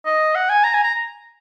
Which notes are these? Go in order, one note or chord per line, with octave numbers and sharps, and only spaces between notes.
D#5
F#5
G#5
A#5
G#5
A#5